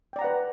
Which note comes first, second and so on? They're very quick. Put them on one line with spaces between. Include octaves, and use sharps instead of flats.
G5 D5 A#5 F#5 B4